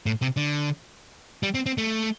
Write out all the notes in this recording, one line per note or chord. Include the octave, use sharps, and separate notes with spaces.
A2
C3
D3
G3
C4
C4
A3